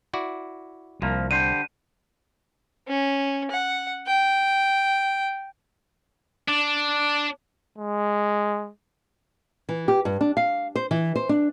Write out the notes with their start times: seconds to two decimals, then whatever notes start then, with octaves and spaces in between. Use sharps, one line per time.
0.13 E4 F#4 D5
1.02 C2 F3 A#3
1.31 D3 G3 C5 D#7
2.88 C#4
3.51 F#5
4.07 G5
6.48 D4
7.78 G#3
9.69 E3
9.88 G4
10.05 G2
10.21 D4
10.37 F5
10.75 C5
10.91 E3
11.15 C5
11.29 D4